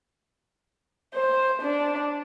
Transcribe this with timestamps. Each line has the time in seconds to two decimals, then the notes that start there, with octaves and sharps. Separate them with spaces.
1.15 C5
1.62 D4